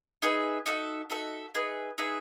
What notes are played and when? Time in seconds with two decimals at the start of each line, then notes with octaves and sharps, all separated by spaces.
0.22 D#4 G#4 B4 E5
0.66 D#4 F#4 A4 E5
1.10 D#4 F#4 A4 E5
1.54 D#4 G#4 B4 E5
1.98 D#4 G#4 B4 E5